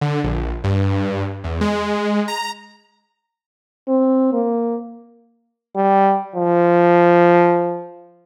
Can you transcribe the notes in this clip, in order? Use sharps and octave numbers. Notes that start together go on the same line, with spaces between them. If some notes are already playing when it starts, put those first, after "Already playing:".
D3
A#1
G2
E2
G#3
A#5
C4
A#3
G3
F3